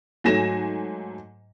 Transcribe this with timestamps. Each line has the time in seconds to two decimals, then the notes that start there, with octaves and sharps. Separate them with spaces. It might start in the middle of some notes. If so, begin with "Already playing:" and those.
0.24 G#2 F#3 A3 G#5 A#6 E7